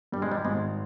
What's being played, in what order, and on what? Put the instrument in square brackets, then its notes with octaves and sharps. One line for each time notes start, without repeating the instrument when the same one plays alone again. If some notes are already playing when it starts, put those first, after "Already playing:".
[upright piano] G2 [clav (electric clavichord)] G3
[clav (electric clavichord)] G#3
G3
[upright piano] G#1 [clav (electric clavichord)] G#3